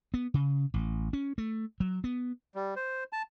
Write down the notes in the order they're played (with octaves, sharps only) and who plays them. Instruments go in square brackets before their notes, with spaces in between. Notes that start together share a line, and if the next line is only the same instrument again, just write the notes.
[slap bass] B3
C#3
A1
C#4
A3
F#3
B3
[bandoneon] G3
C5
A5